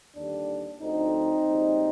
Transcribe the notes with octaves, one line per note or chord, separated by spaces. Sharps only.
D#2 D3 G3 D4
D2 D3 F3 C4 D#4
A#1 G#2 G3